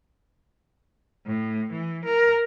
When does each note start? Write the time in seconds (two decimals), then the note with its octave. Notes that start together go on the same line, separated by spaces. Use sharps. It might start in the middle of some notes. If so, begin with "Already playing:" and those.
1.26 A2
1.72 E3
2.05 A#4